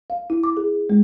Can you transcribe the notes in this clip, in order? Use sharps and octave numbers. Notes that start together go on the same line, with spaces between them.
F5
E4
D6
G#4
G#3